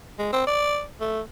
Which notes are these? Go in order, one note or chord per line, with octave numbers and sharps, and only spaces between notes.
G#3
C4
D5
A3